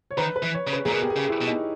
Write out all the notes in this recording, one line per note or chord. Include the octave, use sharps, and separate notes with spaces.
C#5
D#3 B4
B4
E3
C#5
C#3
B4
A#2 G#4
B2 A#4
G4
G#4
C#3
E4
B2
D#4